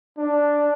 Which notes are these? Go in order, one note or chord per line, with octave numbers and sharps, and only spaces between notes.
D4